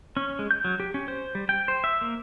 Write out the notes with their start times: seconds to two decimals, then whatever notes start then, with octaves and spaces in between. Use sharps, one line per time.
0.17 C#4
0.39 G#3
0.51 G6
0.64 F#3
0.80 G4
0.94 C#4
1.08 C5
1.35 G3
1.49 G5
1.68 C5
1.84 E5
2.01 A#3